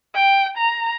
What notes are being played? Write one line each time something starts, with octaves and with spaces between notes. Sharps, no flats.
G5
A#5